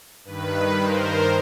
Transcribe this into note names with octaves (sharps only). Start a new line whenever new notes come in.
G2 D#3 B4
A#4 C5